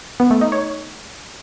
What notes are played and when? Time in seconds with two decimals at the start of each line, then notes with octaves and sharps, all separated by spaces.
0.20 B3
0.31 A3
0.41 D#4
0.52 C#5